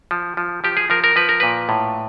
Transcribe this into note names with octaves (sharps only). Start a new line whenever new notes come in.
F3
F3
F3 G4
G#4
F3 A#4
A#4
F3 B4
A#4
A#2 B4
A2